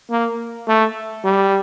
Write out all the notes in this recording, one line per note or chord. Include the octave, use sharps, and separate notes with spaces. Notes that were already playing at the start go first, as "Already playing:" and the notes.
A#3
A3
G3